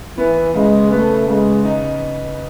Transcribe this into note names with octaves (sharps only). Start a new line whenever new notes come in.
E3 B3
C#3 G#3
A3 B3
C#3 G#3
D#4